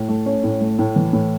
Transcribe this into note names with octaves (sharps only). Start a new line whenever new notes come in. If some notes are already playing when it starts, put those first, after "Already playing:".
Already playing: A2
A3
C#4
A2
A3
A2
E3
A2